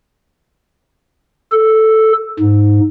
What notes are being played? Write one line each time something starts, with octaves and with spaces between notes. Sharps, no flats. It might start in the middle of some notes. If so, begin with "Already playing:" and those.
A4
G#2